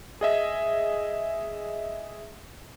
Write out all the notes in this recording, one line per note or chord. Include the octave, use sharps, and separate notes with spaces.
G#4 D#5 E5